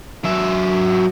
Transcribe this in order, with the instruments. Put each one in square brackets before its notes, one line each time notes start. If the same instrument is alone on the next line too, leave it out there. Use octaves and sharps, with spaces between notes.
[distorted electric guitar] F#3 E5